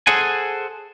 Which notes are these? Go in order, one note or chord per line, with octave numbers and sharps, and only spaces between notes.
G#4 A4 C5 F#5 G#5